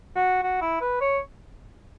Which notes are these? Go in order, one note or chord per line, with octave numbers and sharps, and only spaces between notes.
F#4
F#4
E4
B4
C#5